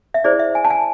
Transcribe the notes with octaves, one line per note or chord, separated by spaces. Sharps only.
E5
E4 G#4 C5 D5
E5
G#5
A5
G#5